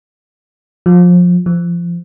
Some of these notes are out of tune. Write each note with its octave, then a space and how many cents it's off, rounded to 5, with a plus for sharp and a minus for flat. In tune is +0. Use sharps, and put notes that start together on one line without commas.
F3 +25
F3 -20